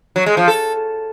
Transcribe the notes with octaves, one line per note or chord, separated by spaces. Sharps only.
F#3
G#3
F3
A4